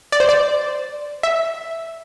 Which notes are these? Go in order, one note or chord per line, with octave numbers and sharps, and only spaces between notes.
D5
C5
D5
E5